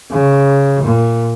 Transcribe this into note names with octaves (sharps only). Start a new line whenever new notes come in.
C#3
A#2